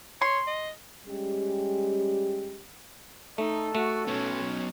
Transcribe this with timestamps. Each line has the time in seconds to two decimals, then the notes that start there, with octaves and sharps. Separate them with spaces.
0.22 C#5 C6
0.47 D#5
1.07 G3 G#3 C#4 G4
3.38 A3 D#4 A4
3.75 A3 F#4
4.08 F#3 B3 C#4